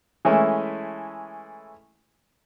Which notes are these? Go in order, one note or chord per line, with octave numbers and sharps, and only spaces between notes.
E3 G#3 A3 C#4 E4